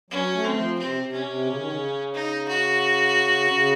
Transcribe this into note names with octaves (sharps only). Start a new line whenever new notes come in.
F#3 C#4
A3
C4
D#3
F3
C3 C4
C3
C#4
C3
C#3
D#3
C#3
D#4
F#4
C#3